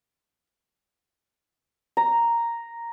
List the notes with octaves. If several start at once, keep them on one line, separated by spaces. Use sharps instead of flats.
A#5